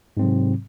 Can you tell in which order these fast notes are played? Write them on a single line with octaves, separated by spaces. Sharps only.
G#2 C4 F#3 C3